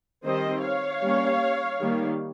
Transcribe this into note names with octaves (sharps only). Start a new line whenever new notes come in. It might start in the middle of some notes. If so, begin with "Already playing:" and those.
D#3 G3 C4 C5 D#5
C#5 F5
G3 A#3 C#4
D#3 G3 A#3